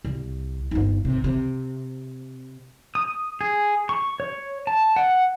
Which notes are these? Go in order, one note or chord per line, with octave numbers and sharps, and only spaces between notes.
C2
G1 D#4
C3
C3
D#6
G#4
C#6
C#5
A5
F#5